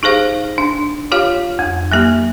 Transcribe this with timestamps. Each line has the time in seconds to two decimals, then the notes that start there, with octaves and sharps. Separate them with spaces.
0.03 D#4 G4 G#4 C5 F5
0.58 D4
1.12 F4 G4 C#5 F5
1.59 F2
1.92 F#3 A#3 G4